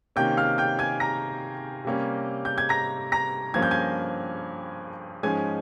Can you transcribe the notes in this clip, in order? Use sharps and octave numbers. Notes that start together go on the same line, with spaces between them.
C3 D#3 A#3 C#4 G5 G6
F5 F6
G5 G6
G#5 G#6
A#5 A#6
C3 G3 A#3 C#4
G6
G#6
A#5 A#6
A#5 A#6
G2 F3 A#3 C#4 G#6
G6
G#5 G#6
G#2 F3 G#3 C#4 G#5 G#6